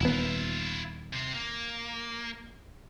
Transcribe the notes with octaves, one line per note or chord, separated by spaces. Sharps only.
D#1 B3 E4 F4
C3 C5
A#3